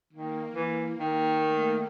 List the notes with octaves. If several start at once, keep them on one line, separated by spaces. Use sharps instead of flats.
D#3 A#3
E3 A#3
D#3 A#3
A3